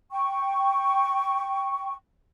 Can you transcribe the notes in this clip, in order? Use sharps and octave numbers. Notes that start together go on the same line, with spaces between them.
G5 C#6